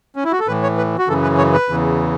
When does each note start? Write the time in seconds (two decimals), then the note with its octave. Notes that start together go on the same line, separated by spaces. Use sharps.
0.16 C#4
0.24 E4
0.32 F#4
0.40 A4
0.47 A2 E3 B4
0.63 C#5
0.78 B4
0.98 F#4
1.08 F#2 C#3 E3 A4
1.23 B4
1.38 C#5
1.53 B4
1.69 E2 C#3 E3